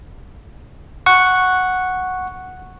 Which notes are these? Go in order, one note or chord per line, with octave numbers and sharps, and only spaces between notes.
F#5 C#6